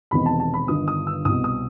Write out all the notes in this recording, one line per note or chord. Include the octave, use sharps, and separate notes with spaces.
E1 E2 C3 D#3 B5
A5
A5
B5
G1 G2 D#3 D#6
D#6
E6
C2 B2 D#6
D#6